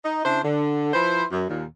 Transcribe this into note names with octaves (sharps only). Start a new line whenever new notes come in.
D#4
C#3 D4 E4 C5
D3
F3 E4 B4 C5
F#2
D#2 A#2